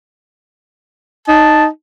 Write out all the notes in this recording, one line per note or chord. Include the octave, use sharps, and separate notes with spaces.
D#4 A5